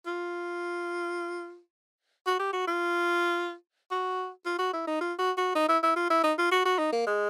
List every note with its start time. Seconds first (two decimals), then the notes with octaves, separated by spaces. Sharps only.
0.06 F4
2.26 F#4
2.39 G4
2.53 F#4
2.67 F4
3.91 F#4
4.45 F4
4.59 F#4
4.74 E4
4.87 D#4
5.01 F4
5.19 F#4
5.38 F#4
5.55 D#4
5.69 E4
5.83 E4
5.96 F4
6.10 E4
6.24 D#4
6.38 F4
6.51 F#4
6.65 F#4
6.78 D#4
6.92 A#3
7.06 G#3